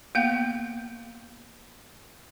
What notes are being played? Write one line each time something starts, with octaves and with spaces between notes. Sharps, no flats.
A#3 B3 F5 G5